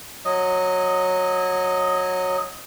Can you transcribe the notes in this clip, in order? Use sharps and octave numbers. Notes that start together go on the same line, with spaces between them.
F#3 D#5